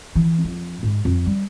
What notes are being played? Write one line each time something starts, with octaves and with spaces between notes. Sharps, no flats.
E3
F2
G#2
F2
G3